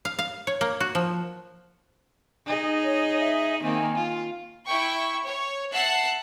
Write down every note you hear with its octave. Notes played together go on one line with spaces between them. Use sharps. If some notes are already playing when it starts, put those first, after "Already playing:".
F5
F5
C#5
A#3
F#4
F3
D#4 G#4 D#5
C#5
E5
D#3 A#3 C4 G#5
F4
E4 G5 C#6
C#5
E5 F#5 A5 F#6 C7